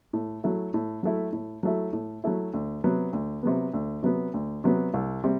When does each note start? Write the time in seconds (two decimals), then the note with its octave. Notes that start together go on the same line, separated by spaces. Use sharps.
0.13 A2
0.44 F#3 A3 E4
0.74 A2
1.03 F#3 A3 E4
1.33 A2
1.63 F#3 A3 E4
1.93 A2
2.24 F#3 A3 E4
2.54 D2
2.84 C3 F#3 B3
3.13 D2
3.43 C3 F#3 B3
3.74 D2
4.03 C3 F#3 B3
4.34 D2
4.64 C3 F#3 B3
4.94 C2
5.24 C3 G3